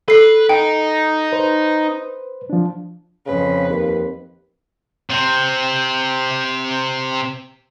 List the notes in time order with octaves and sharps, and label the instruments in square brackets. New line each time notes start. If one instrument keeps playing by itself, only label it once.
[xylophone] A4 C7 [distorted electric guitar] B4
[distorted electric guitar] D#4 [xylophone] G5
[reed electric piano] B4 C5
F3 D4
[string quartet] F2 B4 [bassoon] C#3
[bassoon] D#2
[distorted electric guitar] C3 C4